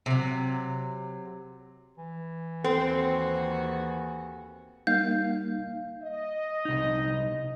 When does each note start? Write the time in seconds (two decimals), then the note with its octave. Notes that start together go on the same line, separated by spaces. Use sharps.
0.06 C3 F#3
1.98 E3
2.64 D#2 C4 F#4 A4
4.87 G3 A#3 D#4 F5 G6
6.03 D#5
6.65 C2 D#4